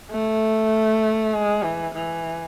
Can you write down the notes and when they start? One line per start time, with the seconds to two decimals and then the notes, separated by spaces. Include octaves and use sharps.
0.11 A3
1.33 G#3
1.64 E3
1.95 E3